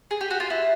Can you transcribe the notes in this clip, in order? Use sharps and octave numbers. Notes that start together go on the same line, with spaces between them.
G#4
G4
F#4
F4
E4